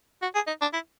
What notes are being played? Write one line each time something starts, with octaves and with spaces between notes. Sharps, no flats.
F#4
G#4
D#4
D4
E4